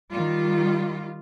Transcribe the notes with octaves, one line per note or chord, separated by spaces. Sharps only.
D#3 G3 F4